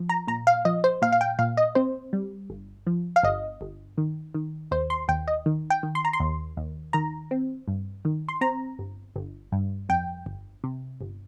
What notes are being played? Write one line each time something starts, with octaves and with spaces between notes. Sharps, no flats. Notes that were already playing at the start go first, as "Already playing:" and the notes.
Already playing: F3
A#5
A#2 A#5
F5
F3 D#5
C5
A#2 F5
F5
G5
A#2 F5
D#5
C4 C5
G3
G1
F3
F5
G1 D#5
G1
D#3
D#3
D#2 C5
C6
D#2 G5
D#5
D#3
G5
D#3
C6
A#5
C6
D#2
D#2
D#3 A#5
C4
G2
D#3
C6
C4 A#5
G1
G1
G2
F2 G5
G1
C3
G1